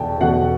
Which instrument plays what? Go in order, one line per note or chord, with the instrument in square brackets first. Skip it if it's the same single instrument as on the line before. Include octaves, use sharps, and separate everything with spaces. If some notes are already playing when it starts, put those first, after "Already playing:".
Already playing: [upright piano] E2 B2 G5 A5
E2 B2 F#5